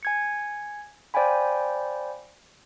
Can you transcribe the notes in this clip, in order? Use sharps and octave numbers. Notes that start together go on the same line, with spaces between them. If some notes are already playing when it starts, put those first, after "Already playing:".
G#5 G#6 C#7
C5 D5 F5 G5 G#5 B5